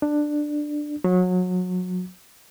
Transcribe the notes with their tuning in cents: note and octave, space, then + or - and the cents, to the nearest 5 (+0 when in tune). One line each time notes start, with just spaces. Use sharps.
D4 +10
F#3 -25